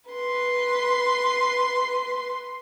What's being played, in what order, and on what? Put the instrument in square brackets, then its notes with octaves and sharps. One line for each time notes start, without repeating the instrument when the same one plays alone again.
[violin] B4 C6